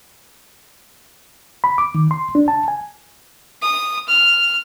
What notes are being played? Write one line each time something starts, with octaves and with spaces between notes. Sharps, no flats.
B5
D6
D#3
C6
D4
A5
G#5
D#6
F6